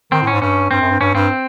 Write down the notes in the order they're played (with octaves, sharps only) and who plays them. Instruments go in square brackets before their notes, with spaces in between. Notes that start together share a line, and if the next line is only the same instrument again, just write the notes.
[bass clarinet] D#3 [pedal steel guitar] C4
[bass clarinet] A2
[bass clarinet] G#2 [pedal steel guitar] C#4
[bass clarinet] G2 [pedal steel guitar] C#4
[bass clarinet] G2 [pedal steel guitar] C4
[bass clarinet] F#2
G2
[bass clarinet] G2 [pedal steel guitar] C#4
[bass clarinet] G2 [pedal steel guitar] C4